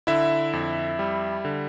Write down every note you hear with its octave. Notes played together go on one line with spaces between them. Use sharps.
D3 E4 E5
F2
G3
D3